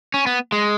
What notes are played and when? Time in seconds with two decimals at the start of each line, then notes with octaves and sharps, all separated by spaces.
0.14 C#4
0.27 B3
0.52 G#3